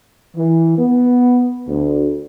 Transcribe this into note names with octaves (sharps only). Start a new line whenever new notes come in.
E3
B3
D2